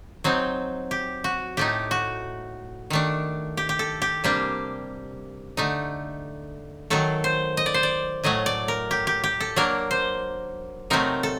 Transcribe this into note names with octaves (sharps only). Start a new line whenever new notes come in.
F#3 C4 D#4
G4
F#4
A2 A3 D#4 G4
F#4
D#3 A3 D4
G4
G4
A4
G4
C3 G3 A#3 D4 G4
D3 A3 D#4
D#3 F#3 A3 A4
C5
D#5
D5
C5
D5
A2 F#3 A3 D#5
D5
A#4
G4
G4
G4
A4
F#3 A#3 D4 A#4
C5
C3 F#3 A3 C4 D#4 A#4
A4